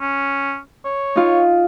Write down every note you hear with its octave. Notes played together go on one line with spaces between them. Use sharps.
C#4
C#5
D#4 F4